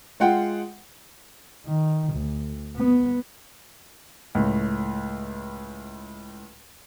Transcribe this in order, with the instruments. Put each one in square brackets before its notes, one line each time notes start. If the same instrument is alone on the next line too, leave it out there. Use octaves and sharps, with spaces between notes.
[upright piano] G#3 F4 F#5 G5
[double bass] D#3
D2
B3
[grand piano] C#2 A2